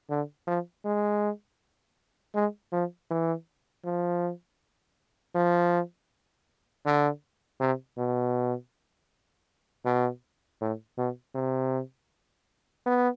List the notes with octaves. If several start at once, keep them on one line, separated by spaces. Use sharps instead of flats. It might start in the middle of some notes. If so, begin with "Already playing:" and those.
D3
F3
G#3
G#3
F3
E3
F3
F3
D3
C3
B2
B2
A2
B2
C3
B3